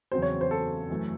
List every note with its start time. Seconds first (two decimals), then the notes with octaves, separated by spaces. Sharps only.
0.12 E2 C#3 F#3 C4 C5
0.22 C#5
0.41 C5
0.51 A4
0.90 F#2 E3 A3